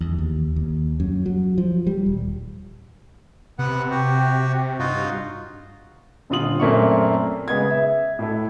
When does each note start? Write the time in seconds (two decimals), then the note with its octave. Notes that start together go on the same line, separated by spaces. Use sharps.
0.01 E2
0.18 D#2
0.56 D#2
1.00 F#2
1.26 F#3
1.58 F3
1.87 G3
2.06 D#1
3.59 C3 B3 F#5
3.91 F#4 G4
4.79 G2 D#4 F4 F#4
6.30 D#1 D3 F4 D#6 F#7
6.60 F#2 A#2 A3 A#3 C4 C#6
7.48 C#3 G#3 B3 G#6
7.70 E5
8.19 A2 A3